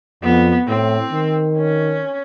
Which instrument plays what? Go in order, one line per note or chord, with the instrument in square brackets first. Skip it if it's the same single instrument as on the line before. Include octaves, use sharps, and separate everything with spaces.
[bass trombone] F2 [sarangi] B3
[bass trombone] A2 [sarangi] C4
[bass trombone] D#3
[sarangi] C#4